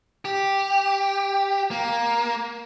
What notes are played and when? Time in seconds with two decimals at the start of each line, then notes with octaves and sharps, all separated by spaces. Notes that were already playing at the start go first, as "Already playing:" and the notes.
0.25 G4
1.71 A#3